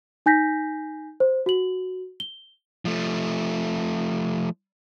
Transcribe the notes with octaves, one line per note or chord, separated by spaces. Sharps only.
D#4 G#5 G6 A#6 B6
C5
F#4 F#7
G7
F3 A3